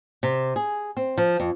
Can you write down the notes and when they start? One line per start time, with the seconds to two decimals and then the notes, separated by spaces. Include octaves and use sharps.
0.23 C3
0.56 G#4
0.97 C4
1.18 F3
1.40 F2